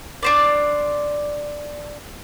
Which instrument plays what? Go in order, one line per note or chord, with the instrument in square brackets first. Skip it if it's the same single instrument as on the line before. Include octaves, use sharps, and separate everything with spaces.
[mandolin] D4 C5 D5